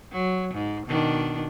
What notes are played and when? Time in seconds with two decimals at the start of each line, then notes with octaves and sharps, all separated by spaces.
0.12 F#3
0.54 G#2
0.86 B2 D#3 D4